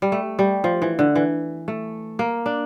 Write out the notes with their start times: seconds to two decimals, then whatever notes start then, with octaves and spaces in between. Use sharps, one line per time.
0.02 G3
0.12 A3
0.39 G3
0.64 F3
0.82 E3
0.99 D3
1.15 E3
1.68 A3
2.19 A#3
2.46 D4